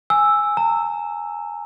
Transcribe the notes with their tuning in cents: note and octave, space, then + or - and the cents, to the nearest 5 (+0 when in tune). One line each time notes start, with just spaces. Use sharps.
G#5 +0 E6 +0
A#5 -30 E6 +0